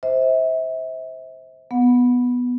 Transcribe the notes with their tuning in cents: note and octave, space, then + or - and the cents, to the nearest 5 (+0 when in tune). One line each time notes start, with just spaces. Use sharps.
C5 +0 E5 -30
B3 +0 F#5 -30